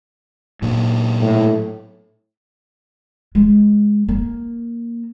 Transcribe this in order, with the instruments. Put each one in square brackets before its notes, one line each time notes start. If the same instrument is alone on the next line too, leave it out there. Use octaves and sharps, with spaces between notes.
[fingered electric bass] A#2 F#3
[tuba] A2
[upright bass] G#3
A#3